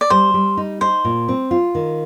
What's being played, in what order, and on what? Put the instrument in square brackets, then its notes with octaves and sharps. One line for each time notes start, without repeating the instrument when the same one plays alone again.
[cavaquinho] D5
[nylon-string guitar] G3 [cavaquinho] C5
[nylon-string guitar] G3
D#4
[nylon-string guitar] D#4 [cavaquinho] C5
[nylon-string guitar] A#2
C4
F4
D#3